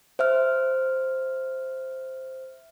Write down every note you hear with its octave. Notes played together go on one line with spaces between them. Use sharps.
C5 E5 F6